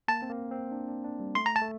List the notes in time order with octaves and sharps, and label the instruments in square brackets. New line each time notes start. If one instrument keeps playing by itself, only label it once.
[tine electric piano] A#3 [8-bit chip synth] A5
[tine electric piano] C4
A#3
C4
D4
D4
D4
G3
[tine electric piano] A3 [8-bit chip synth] C6
[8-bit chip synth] A#5
A5
[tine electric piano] A3